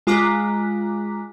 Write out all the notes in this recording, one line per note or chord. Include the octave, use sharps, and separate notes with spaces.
G#3 F4 A#5 D6 F#6 B6